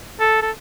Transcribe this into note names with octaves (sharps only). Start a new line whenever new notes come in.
A4
A4